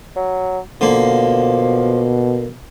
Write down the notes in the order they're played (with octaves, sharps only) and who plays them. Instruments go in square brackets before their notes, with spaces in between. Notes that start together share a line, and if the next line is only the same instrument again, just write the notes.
[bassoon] F#3
[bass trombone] B2 [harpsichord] D3 A#3 [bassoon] F3